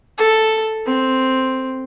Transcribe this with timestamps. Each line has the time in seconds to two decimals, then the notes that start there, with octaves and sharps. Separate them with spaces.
0.18 A4
0.87 C4